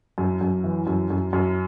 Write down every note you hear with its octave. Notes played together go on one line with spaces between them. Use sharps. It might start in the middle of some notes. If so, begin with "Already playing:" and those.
F#2
F#2
E3
F#2
F#2
F#2